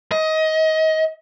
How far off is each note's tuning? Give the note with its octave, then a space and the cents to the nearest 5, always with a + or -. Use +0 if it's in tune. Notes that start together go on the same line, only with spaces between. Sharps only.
D#5 +25